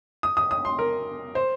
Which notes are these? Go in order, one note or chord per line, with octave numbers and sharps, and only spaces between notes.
D#6
D#6
D#6
C6
A#4
C5